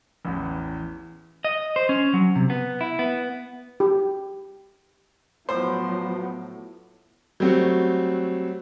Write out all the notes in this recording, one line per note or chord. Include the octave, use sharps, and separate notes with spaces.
A1 E2
D#5
C5
C#4
F#3
C3
B3
E4
B3
G4
A2 F3 F#3 B3 C5 D6
F#3 G3 A3 C4 F#4